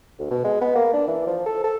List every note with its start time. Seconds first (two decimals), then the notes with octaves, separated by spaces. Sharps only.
0.19 D2
0.31 B2
0.44 G#3
0.61 B3
0.75 A#3
0.93 D4
1.07 E3
1.26 F3
1.46 A4
1.64 A4